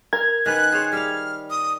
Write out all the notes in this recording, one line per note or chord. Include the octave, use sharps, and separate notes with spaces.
A#4 G#6
D#3 C#4 B4 F#6
G#4 C5 C#5
G3 F5 F6
D#6